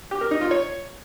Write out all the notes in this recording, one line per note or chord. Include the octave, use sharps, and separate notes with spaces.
G4
A#4
D#4
F4
C#5